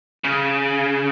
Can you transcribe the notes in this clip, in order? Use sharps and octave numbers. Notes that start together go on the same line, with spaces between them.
C#3